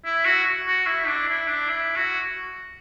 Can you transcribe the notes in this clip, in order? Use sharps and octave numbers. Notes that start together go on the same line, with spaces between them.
E4
F#4
F#4
E4
D4
E4
D4
E4
F#4